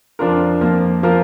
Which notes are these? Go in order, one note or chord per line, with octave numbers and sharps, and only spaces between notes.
F2 F3 D4 F4 A#4
F2 F3 A#3
F3 A#3 F4 A#4